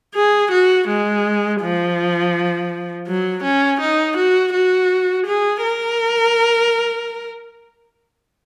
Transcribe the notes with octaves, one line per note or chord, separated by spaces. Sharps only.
G#4
F#4
G#3
F3
F#3
C#4
D#4
F#4
F#4
G#4
A#4